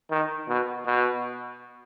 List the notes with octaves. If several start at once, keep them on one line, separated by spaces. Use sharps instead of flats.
D#3
B2
B2